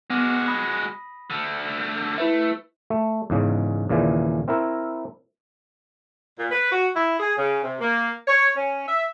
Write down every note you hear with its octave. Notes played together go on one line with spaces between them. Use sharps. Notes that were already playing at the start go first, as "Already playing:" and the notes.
G#3 B3 F#4 D6 F6
B5 D#6 A#6
D3 A3
A3 E4 B4 E5
A3
E2 G#2 C#3
D#2 A#2 C#3 E3
C4 E4 A#4
A#2
B4
F#4
E4
G#4
C#3
C3
A#3
C#5
C#4
E5